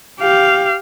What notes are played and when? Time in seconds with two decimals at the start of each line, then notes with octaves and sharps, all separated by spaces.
0.20 G4 F5